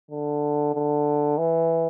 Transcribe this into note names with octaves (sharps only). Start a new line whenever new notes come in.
D3
D3
E3